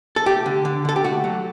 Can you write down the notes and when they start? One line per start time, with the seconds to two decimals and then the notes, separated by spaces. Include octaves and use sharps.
0.16 A4
0.26 A3 G4
0.46 D3
0.65 D3
0.85 D3 A4
0.96 G4
1.04 A3 F#4
1.24 F#3